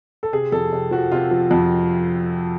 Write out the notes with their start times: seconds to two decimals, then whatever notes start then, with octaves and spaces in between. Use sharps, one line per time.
0.23 A4
0.33 C3 G#4
0.52 F2 A4
0.72 C3
0.91 F3 F#4
1.12 C3 F4
1.31 F3
1.51 F2